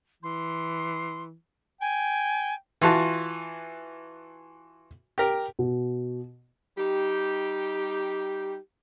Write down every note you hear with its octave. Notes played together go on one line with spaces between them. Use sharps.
E3 C6
G5 G#5
E3 F4 F#4 A5
G4 A#4
B2
G3 D#4 G4